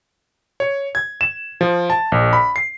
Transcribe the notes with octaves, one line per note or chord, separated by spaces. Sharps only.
C#5
G#6
E7
F3
A5
A#1
B5
C7